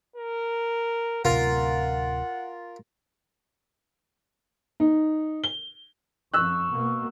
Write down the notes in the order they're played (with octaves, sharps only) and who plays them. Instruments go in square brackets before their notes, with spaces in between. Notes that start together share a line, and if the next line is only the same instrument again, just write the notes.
[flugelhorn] A#4
[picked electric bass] D1 C3 [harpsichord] F4 A#4 [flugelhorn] F#5
[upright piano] D#4
G7
[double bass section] F2 [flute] C#6 [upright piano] E6 F#6
[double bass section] B2 A#3